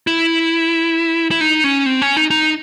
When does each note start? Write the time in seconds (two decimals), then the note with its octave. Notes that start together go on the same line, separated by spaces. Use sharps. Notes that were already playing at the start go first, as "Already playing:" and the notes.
0.07 E4
1.31 E4
1.41 D#4
1.64 C#4
1.86 C4
2.02 C#4
2.17 D#4
2.31 D#4